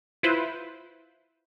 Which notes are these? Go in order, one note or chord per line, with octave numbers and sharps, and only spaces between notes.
E4 F4 B4 C5